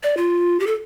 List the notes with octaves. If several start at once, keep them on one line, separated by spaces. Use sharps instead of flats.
D5
F4
G4
A4